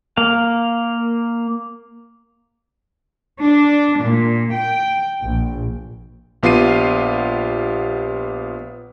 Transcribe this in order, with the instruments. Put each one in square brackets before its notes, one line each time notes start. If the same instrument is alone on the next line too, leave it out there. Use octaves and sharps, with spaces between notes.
[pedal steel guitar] A#3 F5
[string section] D4
A#2
G5
A#1
[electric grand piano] A#1 B3 F4 G4 C7 D#7